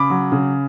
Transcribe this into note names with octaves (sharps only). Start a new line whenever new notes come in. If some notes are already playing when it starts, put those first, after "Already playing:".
Already playing: C#3 B5 D6
F#3
C#3